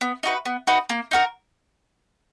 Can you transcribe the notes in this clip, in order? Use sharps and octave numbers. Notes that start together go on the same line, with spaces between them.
B3
D#4 F#4 B4
B3
D#4 F#4 B4
A#3
D#4 F#4 A#4